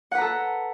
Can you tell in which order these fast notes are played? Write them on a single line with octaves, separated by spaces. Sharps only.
F#5 B4 A#5 A4